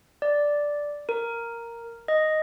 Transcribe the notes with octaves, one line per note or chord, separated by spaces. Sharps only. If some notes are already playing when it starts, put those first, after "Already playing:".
D5
A#4
D#5